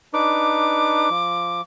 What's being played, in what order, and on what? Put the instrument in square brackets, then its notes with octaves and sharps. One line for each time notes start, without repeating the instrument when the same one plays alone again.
[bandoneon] D4 D#4 B4 [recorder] D6
[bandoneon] F3